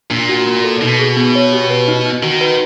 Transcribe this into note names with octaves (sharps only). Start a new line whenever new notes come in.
A#2 D4
F#4
A#3
A4
B2 D#4
G#4
B3
C#5
G4
B4
D#4
D#4
D#3 F#4
B4